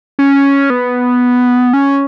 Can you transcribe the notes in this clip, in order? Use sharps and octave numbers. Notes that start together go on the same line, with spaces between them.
C#4
B3
C#4